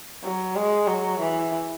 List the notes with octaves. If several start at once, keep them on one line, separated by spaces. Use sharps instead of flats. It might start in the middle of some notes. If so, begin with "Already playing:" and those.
F#3
G#3
F#3
E3